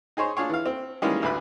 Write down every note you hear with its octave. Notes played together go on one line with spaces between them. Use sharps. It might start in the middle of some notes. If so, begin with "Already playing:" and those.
D#4 G#4 C5 C#5
D4 F4 G#4 C#5
E3 F5
C4
D#3 E3 G3 G#3 A#3 C#4
A1 D2 D3 B4 B5 F#6